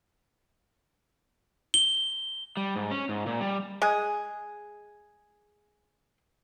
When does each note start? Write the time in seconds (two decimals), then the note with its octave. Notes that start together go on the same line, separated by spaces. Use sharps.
1.74 G7
2.57 G3
2.76 G#2
2.91 C#4
3.09 G#2
3.26 A#2
3.41 G3
3.82 G#3 G#4